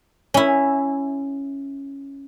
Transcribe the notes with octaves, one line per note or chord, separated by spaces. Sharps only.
C#4 E4